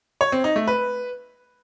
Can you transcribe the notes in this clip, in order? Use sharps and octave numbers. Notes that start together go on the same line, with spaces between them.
C#5
C4
D#4
A3
B4